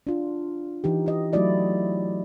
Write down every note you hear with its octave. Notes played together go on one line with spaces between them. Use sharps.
D4 F4
E3 D#4 G4
G4 D#5
F#3 A3 D#4 E4 D5 D#5